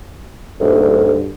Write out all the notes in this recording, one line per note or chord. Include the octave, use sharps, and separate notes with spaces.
D#1 D2 G2